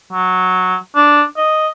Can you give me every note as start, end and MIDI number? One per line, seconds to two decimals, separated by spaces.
0.13 0.76 54
0.95 1.23 62
1.37 1.69 75